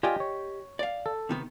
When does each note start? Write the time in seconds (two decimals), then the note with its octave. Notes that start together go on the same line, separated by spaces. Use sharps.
0.03 F4 G4 D5 D#5 G5 G#5
0.20 C#5
0.79 D5 F5
1.06 A4
1.29 C3 D#3 B3